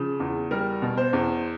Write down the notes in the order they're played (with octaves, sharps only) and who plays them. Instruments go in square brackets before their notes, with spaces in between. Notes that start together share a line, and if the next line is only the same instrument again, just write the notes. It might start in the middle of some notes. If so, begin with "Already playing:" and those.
Already playing: [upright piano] C#3 F3
E2
G3 A#4
B2
C5
E2